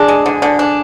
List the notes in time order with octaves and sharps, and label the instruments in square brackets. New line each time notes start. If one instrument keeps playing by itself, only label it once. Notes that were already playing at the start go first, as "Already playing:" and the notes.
Already playing: [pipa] D4 [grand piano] G#4
[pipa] G#3
D3
D3
D4